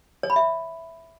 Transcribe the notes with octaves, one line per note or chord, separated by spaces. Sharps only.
C#5
B5
E5